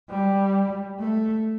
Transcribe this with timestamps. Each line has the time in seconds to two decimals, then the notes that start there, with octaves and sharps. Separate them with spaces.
0.09 G3
1.00 A3